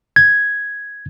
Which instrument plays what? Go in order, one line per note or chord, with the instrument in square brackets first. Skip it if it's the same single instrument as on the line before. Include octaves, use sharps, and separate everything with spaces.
[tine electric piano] G#6